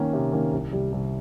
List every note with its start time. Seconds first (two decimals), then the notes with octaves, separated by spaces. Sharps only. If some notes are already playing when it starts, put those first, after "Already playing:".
Already playing: D#3 A#3 C#4
0.13 C3
0.33 D#3 A#3 C#4
0.53 C2
0.72 C3 G3
0.92 C2